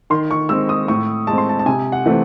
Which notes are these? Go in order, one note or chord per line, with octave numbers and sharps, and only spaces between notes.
D#3 C6
C#6
G#3 C4 E6
D#6
A2 C#6
G#3 C4 A5
C6
A5
A5
C3 G#5
F#5
E3 A3 C4